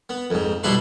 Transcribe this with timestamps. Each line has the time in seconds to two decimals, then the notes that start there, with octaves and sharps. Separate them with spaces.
0.09 B3
0.30 F2 G#2
0.63 B2 F3 G3 E4 B4 C6